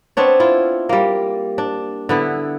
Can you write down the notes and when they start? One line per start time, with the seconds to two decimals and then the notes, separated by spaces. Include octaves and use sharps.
0.17 B3 C4 D4 C#5
0.40 E4 F4
0.89 G3 A#3
1.58 D4
2.09 D3 B3 E4